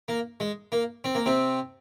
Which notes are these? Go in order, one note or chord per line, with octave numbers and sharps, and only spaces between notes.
A#3
G#3
A#3
C4
A#3
C3 C4